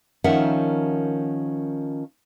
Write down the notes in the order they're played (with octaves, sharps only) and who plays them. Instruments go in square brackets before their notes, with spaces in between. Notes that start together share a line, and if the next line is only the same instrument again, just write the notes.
[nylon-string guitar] D#3 F3 C#4 A#4 E5 F#5